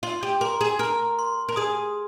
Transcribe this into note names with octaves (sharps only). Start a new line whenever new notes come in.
F4 C6
G4
A#4 C6
G#4
A#4 F6
C6
A#4
G#4 D#6